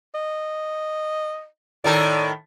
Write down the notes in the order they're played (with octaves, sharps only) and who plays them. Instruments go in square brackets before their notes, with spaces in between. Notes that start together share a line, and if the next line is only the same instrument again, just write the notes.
[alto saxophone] D#5
[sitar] A2 D#3 A4 [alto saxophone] D5